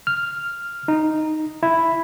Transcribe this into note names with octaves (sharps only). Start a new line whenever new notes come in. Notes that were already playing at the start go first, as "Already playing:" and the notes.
F6
D#4
E4